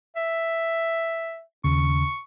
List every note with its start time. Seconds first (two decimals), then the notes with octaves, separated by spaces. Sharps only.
0.16 E5
1.64 D#2 C#3 C#6